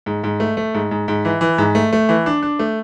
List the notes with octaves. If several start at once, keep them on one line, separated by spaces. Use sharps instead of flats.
G#2
G#2
A3
A3
G#2
G#2
G#2
E3
E3
G#2
A3
A3
E3
D4
D4
A3